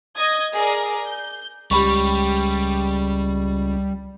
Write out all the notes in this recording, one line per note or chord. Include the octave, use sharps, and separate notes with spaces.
D#5 D#6 G#6
G#4 A#4 D5
G6
C#2 G3 G4 B5 C#6